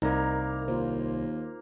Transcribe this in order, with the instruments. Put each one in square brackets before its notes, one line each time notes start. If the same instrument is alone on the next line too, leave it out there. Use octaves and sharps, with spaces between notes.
[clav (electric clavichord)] C2 [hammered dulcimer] A#3 A#5 [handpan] D#4 A#4
[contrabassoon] D#2 [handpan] F4 A#4 C5